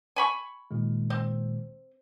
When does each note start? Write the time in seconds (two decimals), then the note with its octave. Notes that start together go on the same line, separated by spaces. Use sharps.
0.16 G#5 B5 C#6
0.71 A#2 D#3 G#3
1.10 C4